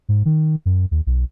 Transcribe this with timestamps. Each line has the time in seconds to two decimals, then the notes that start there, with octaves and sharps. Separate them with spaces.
0.09 G#2
0.25 D#3
0.66 F#2
0.91 D#2
1.07 B1